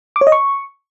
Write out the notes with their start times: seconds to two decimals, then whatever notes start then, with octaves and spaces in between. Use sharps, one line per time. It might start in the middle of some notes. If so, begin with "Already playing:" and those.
0.16 D6
0.21 C#5
0.27 D#5
0.32 C#6